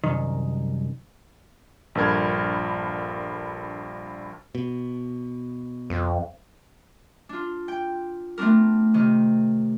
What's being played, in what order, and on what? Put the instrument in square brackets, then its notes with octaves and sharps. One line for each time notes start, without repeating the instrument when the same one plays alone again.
[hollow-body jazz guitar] C2 F#2 D#3
[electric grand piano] A#1 G2 A4 A#4 G#6
[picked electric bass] B2
[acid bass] F2
[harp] D4 F4
G5
A3 B3 C4 D4 A#4
C3 D#3